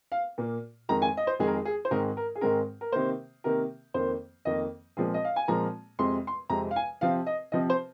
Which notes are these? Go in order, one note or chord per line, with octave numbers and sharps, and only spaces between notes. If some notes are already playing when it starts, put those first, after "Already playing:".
F5
A#2 A#3
F2 D#3 G#3 A#5
G#5
D#5
C5
F2 D#3 G#3 G#4
A#4
G#4
G#4
C5
G#2 D#3 G#3 C4 A#4
A#4
G#4
G#2 D#3 G#3 C4 A#4
A#4
C3 D#3 A#3 C5
C3 D#3 A#3 A#4
F2 D#3 A#3 C5
F2 D#3 A#3 D#5
A#2 F3 G#3 C4 G#4
D#5
F5
G#5
A#2 F3 G#3 C4 A#5
F2 C3 G#3 C4 C6
C6
F2 C3 G#3 C4 A#5
F5
G#5
C3 F3 C4 F5
D#5
C3 F3 C4 D#5
C5